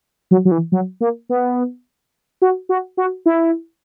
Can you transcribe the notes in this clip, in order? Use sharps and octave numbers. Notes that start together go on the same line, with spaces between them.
F#3
F#3
E3
F#3
A#3
B3
F#4
F#4
F#4
E4